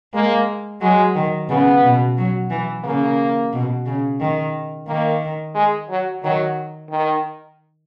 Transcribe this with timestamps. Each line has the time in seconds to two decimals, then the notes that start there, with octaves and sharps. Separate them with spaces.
0.14 G#3 A#3
0.81 F#3 G#3
1.15 D#3
1.49 C#3 B3
1.83 B2
2.17 F#3
2.50 E3
2.84 C#3 A#3
3.53 B2
3.86 C#3
4.20 D#3
4.88 D#3 A#3
5.55 G#3
5.90 F#3
6.23 D#3 F#3
6.90 D#3